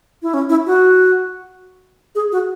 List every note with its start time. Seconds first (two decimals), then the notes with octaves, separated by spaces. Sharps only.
0.22 E4
0.34 C#4
0.50 E4
0.67 F#4
2.15 G#4
2.32 F#4